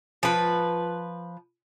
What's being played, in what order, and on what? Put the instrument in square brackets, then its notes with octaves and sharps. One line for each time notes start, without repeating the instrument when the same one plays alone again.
[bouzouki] F3 B4